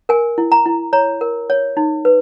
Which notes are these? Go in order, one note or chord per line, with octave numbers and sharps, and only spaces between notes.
A#4 G#5
E4
A#5
E4
C#5 A#5
A#4
C#5
D#4
B4